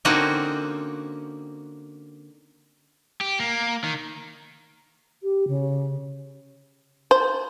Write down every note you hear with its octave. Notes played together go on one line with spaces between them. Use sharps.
D3 A#3 C4 C#4 D#4 F#4
G4
A#3
D#3
G4
C#3
C5